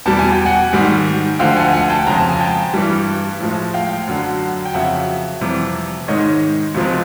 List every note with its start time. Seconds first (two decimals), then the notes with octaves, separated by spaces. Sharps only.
0.06 E2 B2 G3 A5
0.19 G#5
0.32 G5
0.45 F#5 G#5
0.73 G#2 D#3 G3
1.39 D2 D3 F3 F5 G5
1.56 F#5 G#5
1.73 F#5 G#5
1.90 G5 A5
2.06 F2 C#3 F3 G#3 A#5
2.18 A5
2.29 G#5
2.41 G5 A5
2.74 G2 E3 G3
3.40 A2 F3 G#3
3.74 F5 G5
4.07 F#2 D3 F#3
4.65 G5
4.74 F2 C#3 F#3 E5 F#5
5.41 F2 C3 E3 G3
6.08 G#2 D#3 G#3 C#5 D#5
6.75 C#2 C3 F3 G#3